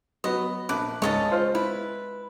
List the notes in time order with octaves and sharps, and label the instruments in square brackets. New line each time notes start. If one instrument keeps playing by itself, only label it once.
[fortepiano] F#3 B3 [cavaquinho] D#5
[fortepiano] A#1 B5 F#6 [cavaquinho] D6
[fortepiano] C#2 G#2 [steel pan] G#3 [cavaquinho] C#5 D#5 A5
[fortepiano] F4 C5 F6
[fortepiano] E4 [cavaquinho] B4